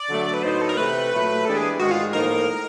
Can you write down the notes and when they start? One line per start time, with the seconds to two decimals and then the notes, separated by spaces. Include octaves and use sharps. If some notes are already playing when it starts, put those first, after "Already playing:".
Already playing: D5
0.08 D3 F#3 A3
0.34 B4
0.43 A2 F#3 B3 D#4 C5
0.61 A4
0.69 A#4
0.77 C3 E3 A3 B4
1.11 A#2 F#3 A3
1.45 E3 G#3 B3 D4 G4 A4
1.57 G#4
1.79 G#2 D#3 G#3 F#4
1.91 F4
2.13 A2 F3 A#3 D#4 A#4